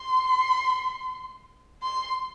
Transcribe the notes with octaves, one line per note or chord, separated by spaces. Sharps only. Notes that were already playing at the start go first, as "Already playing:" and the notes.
Already playing: C6
C6